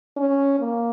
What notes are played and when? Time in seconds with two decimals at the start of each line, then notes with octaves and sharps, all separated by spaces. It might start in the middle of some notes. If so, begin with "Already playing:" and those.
0.17 C#4
0.60 A#3